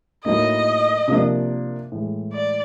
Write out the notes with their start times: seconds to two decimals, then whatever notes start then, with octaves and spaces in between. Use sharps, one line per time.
0.25 A2 F#3 A#3 D#4 D#5
1.08 C3 F3 A#3 D4
1.92 A2 E3 G#3
2.33 D5